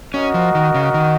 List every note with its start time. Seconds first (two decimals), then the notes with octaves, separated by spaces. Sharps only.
0.14 C#4 F#4 A#4 D#5 F#5
0.34 F3
0.55 D#3
0.74 C#3
0.94 D#3